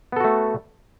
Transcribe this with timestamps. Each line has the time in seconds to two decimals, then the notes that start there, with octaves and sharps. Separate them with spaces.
0.12 B3
0.16 A4
0.20 F#4
0.24 A3